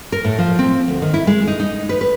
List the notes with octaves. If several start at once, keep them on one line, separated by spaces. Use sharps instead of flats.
A#4
A2
F3
C4
D2
D#3
E4
G#3
D#4
D#4
B4
B4